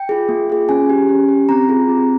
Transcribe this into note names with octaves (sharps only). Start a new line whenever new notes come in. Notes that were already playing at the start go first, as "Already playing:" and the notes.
Already playing: G5
F4 G#4
A#3
F4 G#4
C#4 G#5
G4
C#4
G4
C4 A#5
F4 G#4
C4